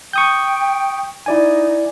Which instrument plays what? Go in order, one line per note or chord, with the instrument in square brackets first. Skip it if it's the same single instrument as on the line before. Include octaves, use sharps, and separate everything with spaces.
[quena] G5 [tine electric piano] C#6 D#6 G6
[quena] D#4 [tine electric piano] E4 D5 G#5